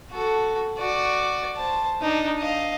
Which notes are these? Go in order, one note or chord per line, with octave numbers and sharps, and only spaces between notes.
F#4 A4
F#4 D5
C5 A5
D4 D#4
D#5 F5